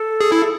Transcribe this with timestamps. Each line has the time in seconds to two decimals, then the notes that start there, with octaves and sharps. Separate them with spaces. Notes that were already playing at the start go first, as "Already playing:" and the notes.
Already playing: A4
0.21 G#4
0.32 E4